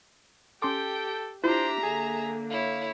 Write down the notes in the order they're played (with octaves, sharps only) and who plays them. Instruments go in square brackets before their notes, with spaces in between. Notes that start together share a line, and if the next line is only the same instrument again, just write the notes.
[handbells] C#4 C6 D6 [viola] G4 [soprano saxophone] A4 [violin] G5
[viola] D4 G4 [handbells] E4 F4 [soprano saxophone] C5 [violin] E5 A#5
[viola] D3 A#3 [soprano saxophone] G#4
[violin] E4 C#5 [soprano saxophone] F5